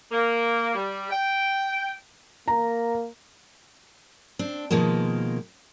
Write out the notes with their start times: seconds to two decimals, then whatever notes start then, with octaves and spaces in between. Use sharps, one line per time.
0.12 A#3
0.75 G3
1.11 G5
2.48 A#3 A#5
4.39 C4 D4
4.71 B2 D#3 F3 G#3 A#3